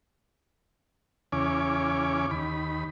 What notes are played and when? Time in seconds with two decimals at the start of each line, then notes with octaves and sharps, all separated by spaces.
1.32 E2 C#3 C#4 G#5 D6
2.31 D#2 B5